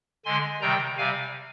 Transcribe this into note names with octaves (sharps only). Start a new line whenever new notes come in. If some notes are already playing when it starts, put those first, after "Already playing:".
D3 G#3 G#5 C6
C3 D#3 G3 G5 A#5
C3 G3 F5 G#5